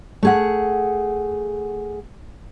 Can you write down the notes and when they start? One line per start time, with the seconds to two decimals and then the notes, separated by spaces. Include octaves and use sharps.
0.23 A3 G#4 F#5